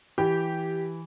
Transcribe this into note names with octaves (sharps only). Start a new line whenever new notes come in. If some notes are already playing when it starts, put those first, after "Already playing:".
E3 G4